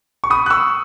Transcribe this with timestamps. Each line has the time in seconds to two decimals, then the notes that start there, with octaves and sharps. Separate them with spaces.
0.24 C#6
0.30 B5 D#6
0.46 F#6
0.50 C#6 E6